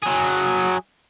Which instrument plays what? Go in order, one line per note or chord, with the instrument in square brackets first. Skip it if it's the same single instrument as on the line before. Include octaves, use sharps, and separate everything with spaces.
[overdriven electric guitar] F#3 G#4